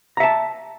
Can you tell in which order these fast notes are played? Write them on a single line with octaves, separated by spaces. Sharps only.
A#5 E5 A5